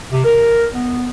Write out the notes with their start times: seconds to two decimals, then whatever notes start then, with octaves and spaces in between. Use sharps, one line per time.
0.12 C3
0.25 A#4
0.74 B3